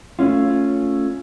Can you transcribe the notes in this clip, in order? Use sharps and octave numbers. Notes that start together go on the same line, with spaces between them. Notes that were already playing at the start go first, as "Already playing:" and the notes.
A3 C#4 F4